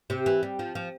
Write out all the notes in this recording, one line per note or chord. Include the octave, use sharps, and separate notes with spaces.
C3
E3
G3
F3
F3